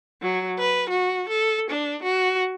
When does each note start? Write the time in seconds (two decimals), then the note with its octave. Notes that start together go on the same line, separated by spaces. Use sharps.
0.22 F#3
0.58 B4
0.89 F#4
1.29 A4
1.70 D4
2.03 F#4